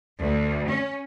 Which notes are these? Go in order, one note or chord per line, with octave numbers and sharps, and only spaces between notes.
D2
C#4